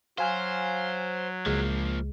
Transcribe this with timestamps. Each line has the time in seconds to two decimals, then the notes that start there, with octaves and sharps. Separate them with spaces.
0.18 F#3 C5 F5 G#5 F6
1.46 C#2 F3 G#3 A#3